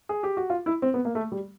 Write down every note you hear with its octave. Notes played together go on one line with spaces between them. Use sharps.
G#4
G4
F#4
F4
E4
C4
B3
A#3
A3
G3